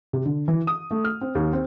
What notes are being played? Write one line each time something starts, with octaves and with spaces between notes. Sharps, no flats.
C3
D3
E3
D#6
A3
F6
C4
D#2
C4